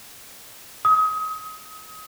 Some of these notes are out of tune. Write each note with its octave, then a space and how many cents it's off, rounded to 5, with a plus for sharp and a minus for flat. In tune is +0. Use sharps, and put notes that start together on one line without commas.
D#6 +30